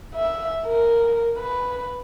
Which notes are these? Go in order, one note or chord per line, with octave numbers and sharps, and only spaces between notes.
E5
A#4
B4